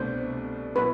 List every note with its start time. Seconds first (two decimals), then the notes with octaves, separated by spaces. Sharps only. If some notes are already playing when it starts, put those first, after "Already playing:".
Already playing: C2 B2 A3 D4 C5
0.76 B2 F#3 B3 E4 B4